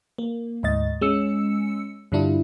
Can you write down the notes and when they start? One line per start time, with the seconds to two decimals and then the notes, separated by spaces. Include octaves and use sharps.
0.18 A#3
0.63 D2 G#2 D#5 A6
1.01 G#3 C#4 E6 C#7
2.12 G2 D3 G3 D4 E4 F4